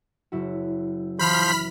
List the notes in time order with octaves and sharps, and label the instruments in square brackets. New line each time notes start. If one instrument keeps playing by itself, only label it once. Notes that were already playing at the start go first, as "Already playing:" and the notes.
[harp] F#1 E4 F#4
[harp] E3 [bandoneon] F3 C6 G6 [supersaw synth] B5 F6 B6